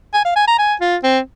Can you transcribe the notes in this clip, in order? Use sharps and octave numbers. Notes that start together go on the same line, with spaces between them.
G#5
F5
G#5
A#5
G#5
F4
C4